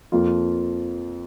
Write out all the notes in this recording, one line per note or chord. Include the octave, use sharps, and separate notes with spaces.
F2 F3 A#3 F4